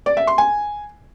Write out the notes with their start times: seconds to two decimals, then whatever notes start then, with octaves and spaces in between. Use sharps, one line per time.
0.06 D5
0.17 E5
0.27 C6
0.38 G#5